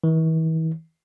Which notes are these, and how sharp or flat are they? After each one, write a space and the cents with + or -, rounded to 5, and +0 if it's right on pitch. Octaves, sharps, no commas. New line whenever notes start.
E3 -45